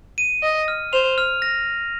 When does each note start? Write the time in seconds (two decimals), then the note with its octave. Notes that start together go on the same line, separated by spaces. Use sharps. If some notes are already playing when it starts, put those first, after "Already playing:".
0.18 D#7
0.42 D#5 D#7
0.68 F6
0.93 C5 F7
1.18 F6
1.42 A#6